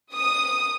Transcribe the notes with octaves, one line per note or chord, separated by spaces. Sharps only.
D#6